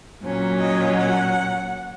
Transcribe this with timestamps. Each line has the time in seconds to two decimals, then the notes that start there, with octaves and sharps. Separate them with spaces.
0.24 A#2 F#3 C#4
0.60 D#5
0.97 F#5